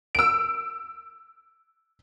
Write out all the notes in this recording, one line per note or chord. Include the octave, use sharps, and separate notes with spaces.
E6 D7